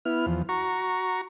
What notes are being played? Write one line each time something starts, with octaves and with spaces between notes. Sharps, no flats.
B3 E4 F6
E2 F3
F#4 A#5 C#6